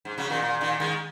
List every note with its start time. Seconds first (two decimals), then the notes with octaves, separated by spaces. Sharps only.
0.05 G#2
0.18 C#3 F#3
0.30 A#2 D#3
0.43 A#2
0.61 A#2 D#3
0.80 D#3 G#3